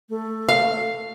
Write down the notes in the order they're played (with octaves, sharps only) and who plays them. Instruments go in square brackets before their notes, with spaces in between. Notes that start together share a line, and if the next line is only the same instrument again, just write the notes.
[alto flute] A3
[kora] F5